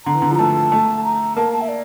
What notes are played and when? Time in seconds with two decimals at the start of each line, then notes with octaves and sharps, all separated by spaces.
0.06 D3 A#5
0.14 E3
0.22 D3
0.31 F3
0.35 A#5
0.39 A3 A5
0.72 A3
1.04 A#5
1.36 A#3 A5
1.53 A5
1.61 E5
1.69 D5